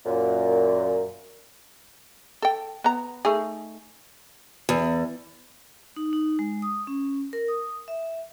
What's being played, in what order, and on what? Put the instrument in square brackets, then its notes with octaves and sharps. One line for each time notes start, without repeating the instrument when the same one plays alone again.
[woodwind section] F#2 A#2
[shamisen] A4 G5
B3 A#5
A3 D#4 G#4
[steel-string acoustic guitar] E2
[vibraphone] D#4
D#4
G#3
D#6
C#4
A#4
D#6
E5